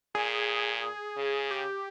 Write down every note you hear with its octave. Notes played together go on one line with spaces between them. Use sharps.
A#2 G#4
C#3
G4